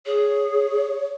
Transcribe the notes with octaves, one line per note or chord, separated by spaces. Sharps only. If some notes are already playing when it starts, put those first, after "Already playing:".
G#4 C#5